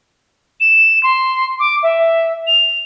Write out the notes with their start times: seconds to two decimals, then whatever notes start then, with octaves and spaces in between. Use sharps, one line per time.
0.60 E7
1.03 C6
1.59 D6
1.83 E5
2.47 F7